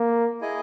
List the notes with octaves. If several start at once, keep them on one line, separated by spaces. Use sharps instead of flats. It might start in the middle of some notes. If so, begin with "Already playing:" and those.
Already playing: A#3
E4 G#4 D#5 G#5